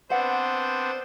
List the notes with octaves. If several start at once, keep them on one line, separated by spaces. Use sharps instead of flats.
B3 C4 D4 B4 C5 F#5